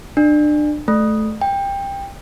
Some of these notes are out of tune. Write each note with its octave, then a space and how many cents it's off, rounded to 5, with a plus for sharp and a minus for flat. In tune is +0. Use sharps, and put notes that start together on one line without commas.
D4 +30
A3 -20
G5 +20